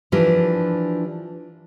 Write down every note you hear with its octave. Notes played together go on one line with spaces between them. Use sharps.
E3 F3 D4 E4 G4 A#4